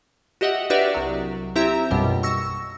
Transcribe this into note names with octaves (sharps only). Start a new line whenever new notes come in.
F#4 G4 D#5 E5 F#5
D4 F#4 G4 B4 D5 E5
C2 F#3
C4 E4 G4 E5 A#5
A#1 F#2 B2 G3
C#6 E6 A#6